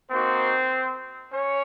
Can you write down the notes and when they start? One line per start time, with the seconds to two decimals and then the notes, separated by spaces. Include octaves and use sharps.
0.11 A#3 C4 D#4 F#4 C5
1.34 C#4 C#5